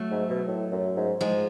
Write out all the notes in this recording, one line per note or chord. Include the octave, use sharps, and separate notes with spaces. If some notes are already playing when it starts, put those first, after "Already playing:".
Already playing: F#3 A3
G#2
B2
A2
F#2
G#2
G#2 F3 G#3